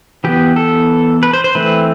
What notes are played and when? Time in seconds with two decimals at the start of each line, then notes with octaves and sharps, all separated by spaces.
0.24 E3 B3 G4
0.56 A4
1.23 B4
1.33 C5
1.44 C5
1.55 E3 A3 C4 B4